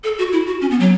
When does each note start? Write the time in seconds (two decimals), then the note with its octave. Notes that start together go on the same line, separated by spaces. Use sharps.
0.04 A4
0.18 F#4
0.32 E4
0.47 F#4
0.61 C#4
0.71 B3
0.80 F#3